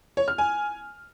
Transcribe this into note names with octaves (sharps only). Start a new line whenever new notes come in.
C#5
F6
G#5